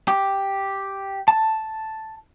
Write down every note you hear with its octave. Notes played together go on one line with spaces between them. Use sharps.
G4
A5